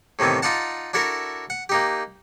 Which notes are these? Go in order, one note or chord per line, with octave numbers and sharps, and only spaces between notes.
A2 C3 D#3 E3 B3
D#4 F4 D5 F#5 A5
D4 E4 F#4 A4 A#4 E5
F#5
A#3 D#4 G4